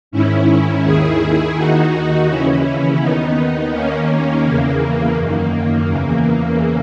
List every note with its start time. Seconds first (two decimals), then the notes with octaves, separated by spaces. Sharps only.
0.11 G#2 D#3 C#4 E4
0.83 D#2 D#3 E4 G#4
1.55 D#2 D#3 D#4 F#4
2.28 D#2 C#3 E3 C#4 E4
3.00 D#2 D#3 B3 D#4
3.73 D#2 D#3 A#3 C#4
4.44 E2 C#3 E3 A#3
5.17 F#2 D#3 A#3
5.89 E2 C#3 E3